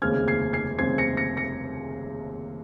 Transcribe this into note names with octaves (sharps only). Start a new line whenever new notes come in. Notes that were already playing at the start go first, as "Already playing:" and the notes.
F1 D#2 C#3 G#3 C4 F6 G#6
G#6 C7
G#6 C7
F1 D#2 C#3 G#3 C4 G#6 C7
A#6 C#7
A#6 C#7
A#6 C#7